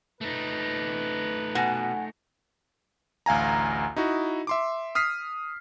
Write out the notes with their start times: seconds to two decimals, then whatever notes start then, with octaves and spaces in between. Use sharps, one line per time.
0.21 A3 D#4 B4
1.55 B2 F#5 G#5
3.26 A1 D2 F5 G#5 A#5
3.96 D#4 E4 F#4 D#5
4.47 E5 C6 D6
4.95 D#6 F6 B6 C7